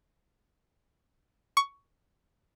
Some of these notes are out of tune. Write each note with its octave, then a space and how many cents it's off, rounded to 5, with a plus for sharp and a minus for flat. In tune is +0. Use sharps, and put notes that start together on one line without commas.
C#6 +10